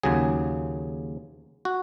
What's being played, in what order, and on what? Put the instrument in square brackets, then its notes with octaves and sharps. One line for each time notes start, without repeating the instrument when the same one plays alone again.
[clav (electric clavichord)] D#2 C#3 F#3 G#4
F#4